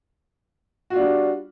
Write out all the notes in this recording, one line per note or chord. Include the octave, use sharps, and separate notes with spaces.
G3 D4 F4 F#4